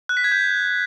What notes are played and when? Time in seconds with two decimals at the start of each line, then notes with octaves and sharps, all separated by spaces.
0.09 F#6
0.17 B6
0.24 G#6
0.32 G6